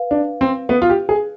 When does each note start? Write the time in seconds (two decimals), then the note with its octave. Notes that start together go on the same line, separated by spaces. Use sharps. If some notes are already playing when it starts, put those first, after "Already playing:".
Already playing: B4 F5
0.11 D4
0.41 C4
0.69 B3
0.82 F4
0.90 G4
1.09 G#4